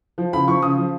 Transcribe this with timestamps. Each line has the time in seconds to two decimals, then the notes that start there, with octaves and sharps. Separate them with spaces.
0.18 F3
0.33 C#3 B5
0.48 F3 C#6
0.62 C#3 D#6
0.77 F3